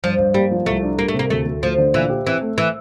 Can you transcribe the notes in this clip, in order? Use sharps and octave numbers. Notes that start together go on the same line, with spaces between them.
G2 F3
G2
G3 A#3
F3
C2 A3
D4
G3 A#3
A3
C3
A#3
D2 A3
D2
F3 A3
D3
A#2 E3
G4
E3 C4
A3
E3